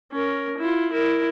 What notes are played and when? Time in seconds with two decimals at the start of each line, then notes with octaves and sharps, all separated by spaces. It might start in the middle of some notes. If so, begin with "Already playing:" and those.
0.12 C#4 A#4
0.58 E4 F4
0.92 E4 A#4